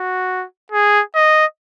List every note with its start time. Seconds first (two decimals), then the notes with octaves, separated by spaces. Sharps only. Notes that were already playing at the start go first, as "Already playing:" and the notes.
Already playing: F#4
0.72 G#4
1.15 D#5